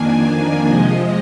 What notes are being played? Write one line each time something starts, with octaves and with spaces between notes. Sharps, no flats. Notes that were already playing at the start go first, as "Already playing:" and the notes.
Already playing: F2 D#3 A#3 D4 G#5
C3 F3 G#3 D#5